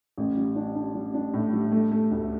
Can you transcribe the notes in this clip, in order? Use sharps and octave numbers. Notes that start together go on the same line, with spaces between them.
A1
G3
D4
D4
G3
D4
A2
G3
A3
A3
D2